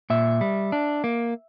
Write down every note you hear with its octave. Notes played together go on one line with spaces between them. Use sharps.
A#2 E5
G3
D4
A#3